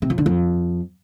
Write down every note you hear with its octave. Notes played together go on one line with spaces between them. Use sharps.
C3
F2
D3
F2